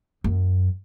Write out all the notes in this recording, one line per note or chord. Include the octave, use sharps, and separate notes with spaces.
F#2